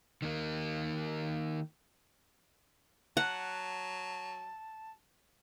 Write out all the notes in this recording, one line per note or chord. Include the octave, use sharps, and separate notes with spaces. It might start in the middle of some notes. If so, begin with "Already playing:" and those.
D#3 A#3
F#3 F#5 A5